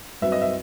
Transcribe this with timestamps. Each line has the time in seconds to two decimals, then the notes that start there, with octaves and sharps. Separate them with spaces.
0.22 G2 F#3 C4 F#4 B4 E5
0.32 D#5
0.42 E5